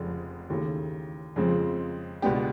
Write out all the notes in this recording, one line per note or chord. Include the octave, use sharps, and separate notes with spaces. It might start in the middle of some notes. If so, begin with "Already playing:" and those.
Already playing: F1 F2 C#3 F3 G#3
D#2 C#3 E3 A3
F2 C#3 F3 G#3 C4
C#2 B2 G#3 B3 D4 G4